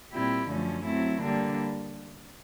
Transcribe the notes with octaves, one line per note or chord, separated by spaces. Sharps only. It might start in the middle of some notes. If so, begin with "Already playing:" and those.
A#2 G3 C4 E4 G4
F#2 D3 F3 A3 C#4
F#3 A3 C4 E4
D3 G3 A#3 D4